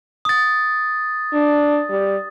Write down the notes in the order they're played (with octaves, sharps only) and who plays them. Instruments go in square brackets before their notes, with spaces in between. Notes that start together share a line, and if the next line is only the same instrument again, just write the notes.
[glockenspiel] D#6 A6
[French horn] D4
G3